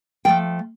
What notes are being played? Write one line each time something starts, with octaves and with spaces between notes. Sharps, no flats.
F3 A3 G5